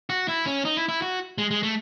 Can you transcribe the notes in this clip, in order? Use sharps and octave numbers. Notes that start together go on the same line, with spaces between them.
F#4
E4
C#4
D#4
E4
E4
F#4
G#3
G#3
A3